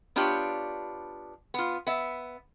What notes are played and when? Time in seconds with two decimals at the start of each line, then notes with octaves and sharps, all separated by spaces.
0.16 B3 D4 F4 G4 C#5
1.54 B3 F4
1.87 B3 E5